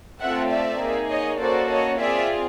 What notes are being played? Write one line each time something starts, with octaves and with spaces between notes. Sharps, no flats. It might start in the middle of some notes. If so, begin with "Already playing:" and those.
A3 C4 F4 A4 E5 F#5
D5 E5
A#3 D#4 G#4
C#5 D#5
A#3 C#4 F#4 A4 C5 D5
C#5 D#5
C4 F4 G#4 D5 E5